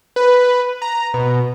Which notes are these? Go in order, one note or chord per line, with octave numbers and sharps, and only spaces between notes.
B4
A#5
B2